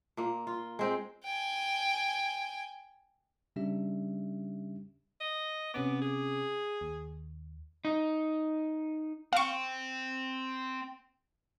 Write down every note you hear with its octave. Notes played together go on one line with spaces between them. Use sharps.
A#2 A#3
F4
G#3 C4 G5
G5 G#5
C#3 G3 C#4 D4 G4 E5
D#5
C3 B3 C#4 D6
G#4
D#2
D#4
C4 F5 C#6